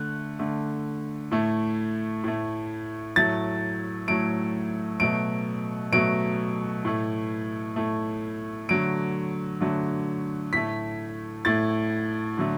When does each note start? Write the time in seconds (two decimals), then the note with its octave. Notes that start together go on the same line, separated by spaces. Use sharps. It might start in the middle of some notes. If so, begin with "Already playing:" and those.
Already playing: D3 A3 F#6
0.39 D3 A3
1.31 A2 A3
2.24 A2 A3
3.16 A2 F#3 A3 A6
4.08 A2 F#3 A3 D7
5.00 B2 F#3 A3 D7
5.92 B2 F#3 A3 D7
6.85 A2 A3
7.76 A2 A3
8.69 D3 F#3 A3 D7
9.60 D3 F#3 A3
10.53 A2 A3 B6
11.45 A2 A3 A6
12.37 D3 F#3 A3